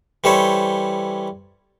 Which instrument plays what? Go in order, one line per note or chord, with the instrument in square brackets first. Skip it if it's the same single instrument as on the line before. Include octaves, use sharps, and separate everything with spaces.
[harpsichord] E3 G3 A4 C5 C#5 E5